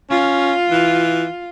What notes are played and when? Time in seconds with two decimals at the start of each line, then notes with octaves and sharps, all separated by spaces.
0.10 C#4 F4
0.71 E3